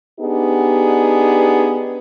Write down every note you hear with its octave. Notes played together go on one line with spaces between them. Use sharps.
B3 D4 D#4 G4 G#4